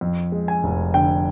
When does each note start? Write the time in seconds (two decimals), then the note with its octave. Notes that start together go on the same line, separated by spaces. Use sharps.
0.01 F2
0.32 G#3
0.48 G#5
0.64 F1
0.94 D3 G5